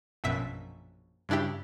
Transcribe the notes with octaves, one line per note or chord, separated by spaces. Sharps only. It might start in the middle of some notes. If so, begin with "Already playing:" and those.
A#1 F#2 B2 E5 B6
G2 C#3 D4 E4 G4